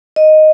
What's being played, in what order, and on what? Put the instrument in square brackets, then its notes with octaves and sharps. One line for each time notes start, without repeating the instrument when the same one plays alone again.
[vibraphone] D#5